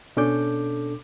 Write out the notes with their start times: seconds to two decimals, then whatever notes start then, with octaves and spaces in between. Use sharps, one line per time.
0.17 B2 C#4 D4 A4 D6 G6